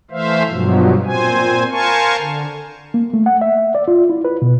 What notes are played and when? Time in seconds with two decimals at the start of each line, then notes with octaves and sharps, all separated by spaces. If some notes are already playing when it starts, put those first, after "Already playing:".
0.11 E3 A3 C5 E5 F5
0.49 G2 B2 F3 F#3
1.06 A#2 C4 C5 G#5
1.71 A#4 C5 F5 G#5 A5 C#6
2.18 D3
2.94 A#3
3.14 A3
3.26 F#5
3.41 E5
3.75 D5
3.88 F4
4.10 E4
4.25 B4
4.42 B2